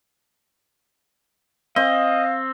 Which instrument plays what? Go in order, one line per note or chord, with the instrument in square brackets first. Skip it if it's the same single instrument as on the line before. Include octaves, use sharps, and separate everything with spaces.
[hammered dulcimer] C4 [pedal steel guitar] D#5 [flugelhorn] F5